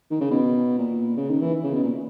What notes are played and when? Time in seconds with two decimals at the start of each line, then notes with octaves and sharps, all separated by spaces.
0.11 D#3
0.20 C#3
0.31 B2
0.78 A#2
1.17 C#3
1.30 D#3
1.42 E3
1.64 C#3
1.74 B2
1.83 A#2